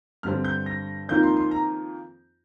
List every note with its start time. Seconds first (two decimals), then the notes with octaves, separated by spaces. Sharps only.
0.23 G2 D3 G3 C4 F6
0.45 G6
0.66 A#6
1.09 F2 D#3 A#3 F4 G6
1.23 C6
1.37 C6
1.51 A#5